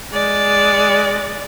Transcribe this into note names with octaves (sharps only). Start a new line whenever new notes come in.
G#3 D5